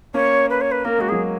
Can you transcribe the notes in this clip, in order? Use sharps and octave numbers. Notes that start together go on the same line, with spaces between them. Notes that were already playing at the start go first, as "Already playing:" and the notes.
A#3 C#4 C#5
B4
C#5
B4
A#3 A#4
G#3 F#4
F#3 A#3 G#4